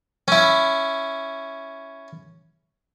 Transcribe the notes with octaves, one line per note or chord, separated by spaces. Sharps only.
C#4 E4